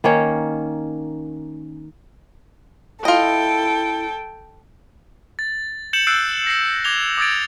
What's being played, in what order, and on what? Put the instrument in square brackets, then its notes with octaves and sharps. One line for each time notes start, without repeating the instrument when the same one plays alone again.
[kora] D#3 A#3 C#4 C#5
[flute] E4 [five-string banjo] F4 D#5 [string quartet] A4 [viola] G5
[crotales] A6
G6 C#7 E7 F#7
E6 F#6 G6 A6 C7 D7
A#6 C7
D6 G#6 F7 G7
D6 D#6 G#6 A6 D7